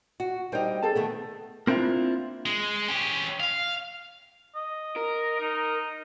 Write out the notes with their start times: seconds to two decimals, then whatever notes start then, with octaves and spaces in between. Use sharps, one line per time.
0.20 F#4
0.52 G3 D4 D#4 C5 G5
0.82 G#4 A4 A5
0.95 D#3 A3 B3
1.67 A#3 C4 D4 E4 F4
2.46 G#3
2.88 C#4 G4
3.40 F5
4.55 D#5
4.96 A#4
5.40 D#4